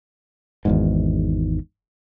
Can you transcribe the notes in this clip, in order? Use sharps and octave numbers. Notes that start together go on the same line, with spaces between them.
G#1 E2 G#2